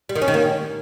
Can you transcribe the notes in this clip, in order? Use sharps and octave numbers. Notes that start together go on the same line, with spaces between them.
G3
D#3
C#4
D#3
A#3